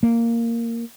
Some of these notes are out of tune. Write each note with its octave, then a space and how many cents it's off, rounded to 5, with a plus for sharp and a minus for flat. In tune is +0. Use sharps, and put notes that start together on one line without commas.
A#3 -10